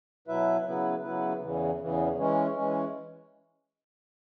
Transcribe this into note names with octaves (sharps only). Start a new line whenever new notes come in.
B2 F#3 E4 B4 E5
C#3 F#3 B3 E4 B4
C#3 F#3 B3 E4 B4
E2 C#3 E3
E2 C#3 E3
E3 G#3 C#4
E3 G#3 C#4